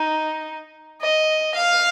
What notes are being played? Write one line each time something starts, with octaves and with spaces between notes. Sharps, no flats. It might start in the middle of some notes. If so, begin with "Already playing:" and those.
Already playing: D#4
D#5
F5